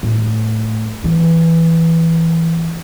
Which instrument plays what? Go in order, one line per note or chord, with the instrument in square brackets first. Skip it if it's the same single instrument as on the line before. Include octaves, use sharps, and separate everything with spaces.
[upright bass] A2
E3